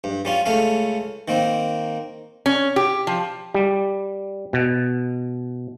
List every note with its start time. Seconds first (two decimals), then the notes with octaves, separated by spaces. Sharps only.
0.04 G2
0.25 G3 C#4 F4
0.46 C#2 A3 C#4 F5
1.28 D#3 A#3 C4
2.46 C#4
2.76 G4
3.07 F3
3.54 G3
4.53 B2